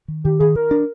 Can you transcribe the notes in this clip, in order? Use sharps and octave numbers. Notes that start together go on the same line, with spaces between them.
D#3
D#3 G4
D#3 G#4
D#3 A#4
D4